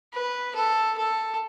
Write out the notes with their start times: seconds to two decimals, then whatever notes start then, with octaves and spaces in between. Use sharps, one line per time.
0.14 B4
0.55 A4
0.98 A4